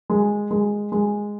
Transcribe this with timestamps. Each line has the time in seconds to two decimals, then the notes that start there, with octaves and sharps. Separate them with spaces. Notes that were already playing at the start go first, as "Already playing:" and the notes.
0.10 G#3
0.51 G#3
0.92 G#3